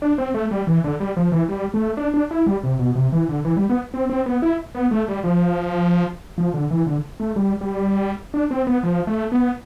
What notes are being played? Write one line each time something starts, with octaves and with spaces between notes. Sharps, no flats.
D4
C4
A3
G3
E3
D3
G3
F3
E3
G3
A3
D4
D4
E4
G3
C3
B2
C3
E3
D3
E3
G3
B3
C4
C4
B3
E4
B3
A3
G3
F3
F3
D3
E3
D3
A3
G3
G3
D4
C4
B3
F3
A3
B3